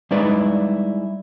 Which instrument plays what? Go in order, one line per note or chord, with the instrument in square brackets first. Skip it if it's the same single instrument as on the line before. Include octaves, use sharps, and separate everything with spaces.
[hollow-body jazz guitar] G3 G#3 D#4 E4 B4 D5